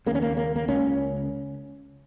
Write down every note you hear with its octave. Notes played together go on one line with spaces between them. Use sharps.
D#2 C#3 A#3 C#4
A#3
A#3
A#3
C#2 C#3 C#4